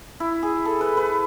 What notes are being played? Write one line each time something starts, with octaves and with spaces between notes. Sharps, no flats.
E4
G#4
A4
B4
B4